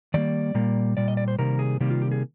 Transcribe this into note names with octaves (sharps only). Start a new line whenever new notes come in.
D#3 G3 A#3 D5
A#2 G3 A#3
A#2 G3 D5
D#5
D5
C5
C3 D#3 G3 A#3 A#4
G#4
C3 D#3 G3 A#3 G4
F4
G4
G#4